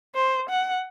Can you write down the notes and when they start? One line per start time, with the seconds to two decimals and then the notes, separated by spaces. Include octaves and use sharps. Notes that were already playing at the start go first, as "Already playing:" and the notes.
0.15 C5
0.50 F#5